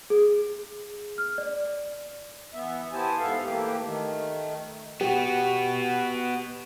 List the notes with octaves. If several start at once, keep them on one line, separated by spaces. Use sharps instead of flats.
G#4
F6
D5
E3 B3 E5
B3 E4 G4 C5 G#5 A5
G#2 B3 A4 E5 F5
E3 A3 A#3 G4
D#3 A3
B3 F#4 G4